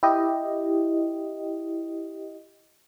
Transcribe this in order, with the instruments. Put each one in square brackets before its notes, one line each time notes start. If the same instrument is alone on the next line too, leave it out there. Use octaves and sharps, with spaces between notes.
[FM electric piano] E4 G4 D#5